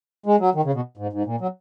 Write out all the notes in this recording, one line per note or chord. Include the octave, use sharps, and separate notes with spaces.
G#3
F#3
D#3
C#3
B2
G#2
G#2
A#2
F#3